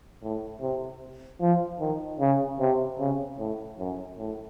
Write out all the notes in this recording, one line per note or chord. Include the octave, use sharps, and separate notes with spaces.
A2
C3
F3
D#3
C#3
C3
C#3
A2
F#2
A2